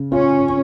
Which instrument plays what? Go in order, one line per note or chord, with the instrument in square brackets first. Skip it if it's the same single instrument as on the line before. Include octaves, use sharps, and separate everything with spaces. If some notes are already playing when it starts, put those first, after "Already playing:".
Already playing: [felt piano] C#3
[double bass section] C#4 [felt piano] F4